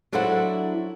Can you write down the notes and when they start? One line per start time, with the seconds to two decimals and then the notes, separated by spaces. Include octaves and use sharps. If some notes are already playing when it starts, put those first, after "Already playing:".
0.12 F#3 D4 E4 A4 C5 F#5